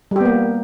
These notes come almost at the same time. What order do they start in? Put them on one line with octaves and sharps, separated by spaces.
G3 G4 B3 A#3